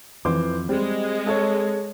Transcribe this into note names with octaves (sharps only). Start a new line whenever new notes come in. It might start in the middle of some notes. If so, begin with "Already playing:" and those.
F2 E3 C5 D6
G3 G#3 C4
A4 C#5